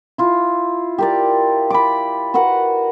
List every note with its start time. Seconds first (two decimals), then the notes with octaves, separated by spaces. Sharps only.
0.18 E4 F4
0.98 G4 A#4 D5
1.70 B5 D6
2.34 F#4 A#4 B4 F#5